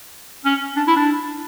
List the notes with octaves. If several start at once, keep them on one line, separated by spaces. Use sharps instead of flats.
C#4
D4
E4
D4